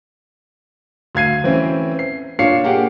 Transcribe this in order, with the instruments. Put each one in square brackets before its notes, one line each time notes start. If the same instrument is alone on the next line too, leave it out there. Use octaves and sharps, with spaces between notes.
[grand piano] D2 F5 G#6 C7 D#7
E3 A3 C4 C#4 E4
C7
A#2 D4 C#5 F5 C7 C#7
A#3 G4 G#4 F#5